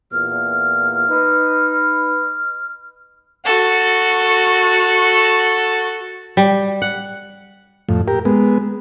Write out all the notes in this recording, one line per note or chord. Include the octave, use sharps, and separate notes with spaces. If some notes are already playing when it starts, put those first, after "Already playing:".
E2 A#2 F6
D#4 B4
F#4 A4
G3
F#5
F2 A2
G4 A#4
G#3 B3